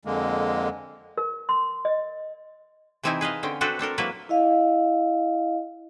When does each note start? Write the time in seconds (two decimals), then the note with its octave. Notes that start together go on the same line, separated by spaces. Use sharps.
0.05 F2 D3 G#3 A#3
1.17 A#4
1.49 C6
1.85 D#5
3.03 C3 E3 C4 D#4 E4 G#5
3.21 G#4 B4 D#5 F5
3.43 D3 C4 C#4 G5
3.61 C4 D4 F#4 A4 B4 C5
3.79 C4 D4 A4 A#4
3.98 F#3 A#3 E4 B4
4.29 E4 D#5 F5